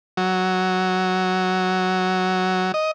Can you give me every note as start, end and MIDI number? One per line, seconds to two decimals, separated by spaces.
0.17 2.72 54
2.74 2.91 75